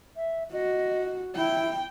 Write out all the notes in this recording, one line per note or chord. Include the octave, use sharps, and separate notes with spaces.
E5
F#4 D#5
E4 G5